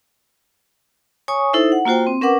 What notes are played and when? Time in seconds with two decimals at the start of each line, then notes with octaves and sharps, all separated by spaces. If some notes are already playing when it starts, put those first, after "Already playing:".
1.28 C#5 G#5 C#6 D#6
1.53 D#4 E4 A4 C5 E5
1.72 F#5
1.85 A#3 F4 F#4 C5 G5
2.07 C4
2.21 C#4 A#4 B4 F#5 D6